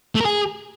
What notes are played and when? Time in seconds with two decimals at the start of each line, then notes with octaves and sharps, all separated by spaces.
0.15 A3
0.20 A#4
0.25 G#4